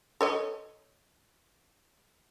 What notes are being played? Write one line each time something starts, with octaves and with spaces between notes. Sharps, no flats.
A4 C#5 D#5